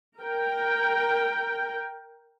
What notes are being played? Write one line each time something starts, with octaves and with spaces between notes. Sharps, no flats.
A#4 G5